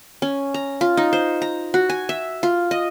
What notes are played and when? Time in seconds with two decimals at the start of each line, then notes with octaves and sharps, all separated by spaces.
0.22 C#4
0.54 A#5
0.81 F4
0.97 D#4
1.13 C5
1.42 A#5
1.74 F#4
1.90 G#5
2.09 E5
2.43 F4
2.71 D#5